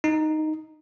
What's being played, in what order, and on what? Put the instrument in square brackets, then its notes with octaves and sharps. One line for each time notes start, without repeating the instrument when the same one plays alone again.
[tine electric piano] D#4